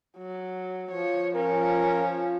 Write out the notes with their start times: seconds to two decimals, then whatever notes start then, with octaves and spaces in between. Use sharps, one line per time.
0.17 F#3
0.91 F3 C#5
1.35 C#4 A#4